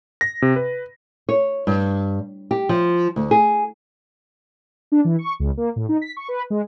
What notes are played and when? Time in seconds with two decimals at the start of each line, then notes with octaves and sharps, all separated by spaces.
0.21 A#6
0.42 C3
0.56 B4
1.29 C#5
1.67 G2
2.51 G4
2.69 F3
3.16 D2
3.31 G#4
4.92 D4
5.05 E3
5.19 C#6
5.40 C#2
5.57 A#3
5.76 A2
5.89 D#4
6.02 B6
6.17 C#6
6.28 B4
6.50 G#3